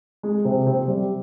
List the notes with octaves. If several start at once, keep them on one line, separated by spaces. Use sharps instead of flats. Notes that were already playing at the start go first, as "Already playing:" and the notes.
G#3
C3 C4
C3 C4
G3